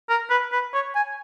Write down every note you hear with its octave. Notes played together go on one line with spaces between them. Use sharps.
A#4
B4
B4
C#5
G#5